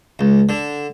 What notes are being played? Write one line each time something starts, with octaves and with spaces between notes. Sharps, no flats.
C#2
D3